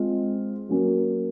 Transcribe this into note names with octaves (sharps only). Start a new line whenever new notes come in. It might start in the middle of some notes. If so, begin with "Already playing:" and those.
Already playing: G#3 C4 F4
F#3 A#3 C#4